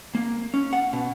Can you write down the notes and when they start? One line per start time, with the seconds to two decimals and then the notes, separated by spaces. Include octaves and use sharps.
0.15 A#3
0.54 C#4
0.73 F#5
0.93 B2